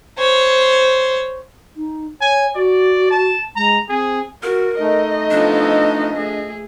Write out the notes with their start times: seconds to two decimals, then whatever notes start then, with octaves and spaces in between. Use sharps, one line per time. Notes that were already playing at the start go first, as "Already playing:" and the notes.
0.18 C5 C#5
1.76 D#4
2.21 C#5 G#5
2.55 F#4 D5
3.11 A5
3.56 G#3 A#5
3.89 C4 G#4
4.43 F#4 A#4
4.80 A3 D#4 D#5
5.31 F3 B3 D4 A4
6.14 A3 G#4